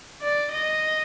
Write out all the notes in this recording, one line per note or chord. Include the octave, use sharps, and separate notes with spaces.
D5
D#5